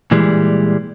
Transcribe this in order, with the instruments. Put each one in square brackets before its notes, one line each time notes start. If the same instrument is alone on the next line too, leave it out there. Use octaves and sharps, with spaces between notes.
[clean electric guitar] A#2 E3 G3 G#3